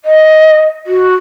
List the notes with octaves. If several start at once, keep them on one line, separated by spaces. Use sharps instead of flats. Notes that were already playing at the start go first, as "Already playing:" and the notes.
D#5
F#4